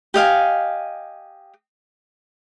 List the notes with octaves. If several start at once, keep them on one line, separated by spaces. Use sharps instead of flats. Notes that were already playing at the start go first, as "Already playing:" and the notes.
G4 D#5 F5 G#5